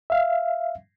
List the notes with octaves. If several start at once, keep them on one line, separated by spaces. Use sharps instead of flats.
E5 F5